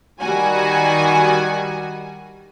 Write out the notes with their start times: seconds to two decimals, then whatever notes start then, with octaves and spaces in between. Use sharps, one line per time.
0.20 D#3 G3 F#4 G#5